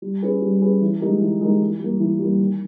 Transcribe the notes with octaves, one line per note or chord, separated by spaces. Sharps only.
G3
C#4 G#4 B4
G3
C#4 G#4 B4
E3
G#3 D#4 G4 A#4
E3
G#3 D#4 G4 A#4
E3
G3 A#3
E3
G3 A#3
D#3